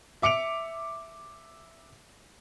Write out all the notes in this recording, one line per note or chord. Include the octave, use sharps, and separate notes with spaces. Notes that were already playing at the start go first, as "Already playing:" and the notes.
E5 D6 C#7 D7 F7